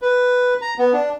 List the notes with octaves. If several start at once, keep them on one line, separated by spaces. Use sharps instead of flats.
B4
A#5
B3
D4